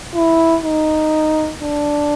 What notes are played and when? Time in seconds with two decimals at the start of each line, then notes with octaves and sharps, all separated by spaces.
0.14 E4
0.64 D#4
1.62 D4